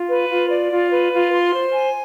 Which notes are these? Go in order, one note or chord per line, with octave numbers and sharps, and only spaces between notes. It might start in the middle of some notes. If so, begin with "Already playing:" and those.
Already playing: F4
B4
F4
D5
F4
B4
F4
C6
C5
G#5